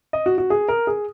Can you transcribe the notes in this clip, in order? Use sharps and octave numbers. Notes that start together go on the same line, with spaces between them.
D#5
F#4
F#4
G#4
A#4
G#4